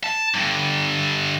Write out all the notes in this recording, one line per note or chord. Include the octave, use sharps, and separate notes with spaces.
A5
G2 D3